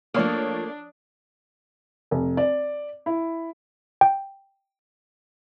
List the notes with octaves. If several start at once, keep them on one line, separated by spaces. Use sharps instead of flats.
F3 A3 A#3 D4 C#5 D#6
F1
D5
E4
G5